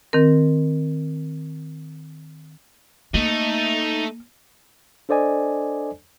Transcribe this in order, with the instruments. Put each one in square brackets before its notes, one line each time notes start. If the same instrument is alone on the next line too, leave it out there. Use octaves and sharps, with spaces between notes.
[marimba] D#3 C4 A#4
[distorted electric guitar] A3 [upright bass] A#3 [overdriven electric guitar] D#4
[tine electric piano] D4 A4 C5 D5 D#5 G#5